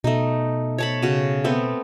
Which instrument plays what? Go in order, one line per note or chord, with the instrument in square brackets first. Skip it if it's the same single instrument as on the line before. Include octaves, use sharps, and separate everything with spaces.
[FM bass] B2 [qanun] A3 D#4
[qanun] C#5 A5 B5
C#3 F#4
A3 B3 C4